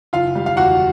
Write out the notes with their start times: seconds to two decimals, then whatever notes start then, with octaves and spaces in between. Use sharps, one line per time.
0.13 F#1 F4 F5
0.35 G3
0.46 F5
0.56 E2 F#4 F#5